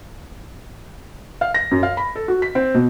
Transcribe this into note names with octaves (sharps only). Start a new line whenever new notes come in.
F5
A#6
F#2
F5
B5
A4
F#4
B6
C4
B2